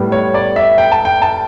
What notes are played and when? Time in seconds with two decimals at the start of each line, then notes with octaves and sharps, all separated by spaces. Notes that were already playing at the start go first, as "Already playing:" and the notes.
Already playing: A2 G3 B3
0.12 C#5
0.34 D5
0.56 E5
0.78 G5
0.92 A5
1.05 G5
1.22 A5